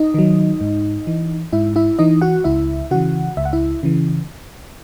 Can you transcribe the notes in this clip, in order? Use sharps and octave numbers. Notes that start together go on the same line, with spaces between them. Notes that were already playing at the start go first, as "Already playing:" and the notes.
Already playing: D#4 D#5
D#3 F#3
G#2
E3
G#2 E4 E5
E4 E5
E3 D#4 D#5
F#4 F#5
C#2 E4 E5
C#3 E3 F#4 F#5
C#2 E5
F#5
E4 E5
C#3 E3